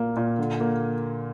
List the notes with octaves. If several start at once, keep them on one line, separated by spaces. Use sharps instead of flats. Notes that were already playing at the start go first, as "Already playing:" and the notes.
Already playing: A#2 A#3
A#2
D3
A#3